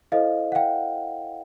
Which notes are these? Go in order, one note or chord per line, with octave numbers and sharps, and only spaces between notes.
E4 A4 C5 D#5 F5
F#5
F5 G5